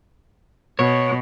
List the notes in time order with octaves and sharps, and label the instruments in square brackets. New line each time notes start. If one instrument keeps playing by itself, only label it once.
[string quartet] B2 [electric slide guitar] C#5